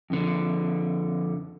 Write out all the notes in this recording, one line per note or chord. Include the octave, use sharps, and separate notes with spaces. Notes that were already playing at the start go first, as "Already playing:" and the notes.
F2 D3